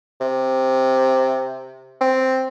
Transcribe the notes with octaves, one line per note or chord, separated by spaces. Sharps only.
C3
C4